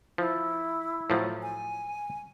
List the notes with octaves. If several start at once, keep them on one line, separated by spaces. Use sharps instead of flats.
F3 E4
A2 F3 F#3
G#5